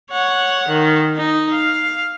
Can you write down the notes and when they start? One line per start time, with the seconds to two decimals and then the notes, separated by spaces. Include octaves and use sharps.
0.11 C#5 F#5
0.68 D#3
1.17 D#4
1.52 F5